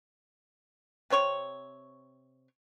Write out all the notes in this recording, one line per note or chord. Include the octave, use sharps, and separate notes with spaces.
C3 C4 C#5 C#6